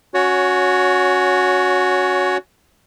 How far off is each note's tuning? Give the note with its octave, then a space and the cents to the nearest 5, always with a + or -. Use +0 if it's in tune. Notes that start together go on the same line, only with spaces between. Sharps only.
C#4 +5 F#4 -10 C#5 +20